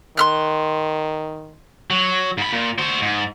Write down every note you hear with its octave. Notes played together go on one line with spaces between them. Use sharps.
D#3 C6 F6 F#6
F#3
G#2 B5
A#2
F#4 C5
G#2